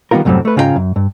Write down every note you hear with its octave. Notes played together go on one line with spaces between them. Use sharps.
D#3 G3 B3 D#4 F4 A#4
C2 F#2 A2 F#3 G3 C4
A3 B4
G#2 C#3 F4 F#4 G5 A#5
F#2
G2